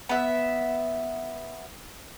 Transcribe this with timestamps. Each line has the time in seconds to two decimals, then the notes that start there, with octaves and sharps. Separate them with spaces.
0.09 B3 E5